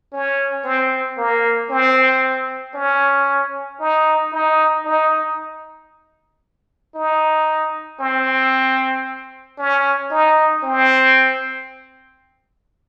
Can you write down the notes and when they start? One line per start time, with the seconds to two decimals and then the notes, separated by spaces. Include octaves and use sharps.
0.12 C#4
0.64 C4
1.17 A#3
1.70 C4
2.74 C#4
3.80 D#4
4.32 D#4
4.85 D#4
6.95 D#4
8.00 C4
9.58 C#4
10.10 D#4
10.63 C4